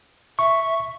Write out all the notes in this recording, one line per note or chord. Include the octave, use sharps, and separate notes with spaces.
E5 C#6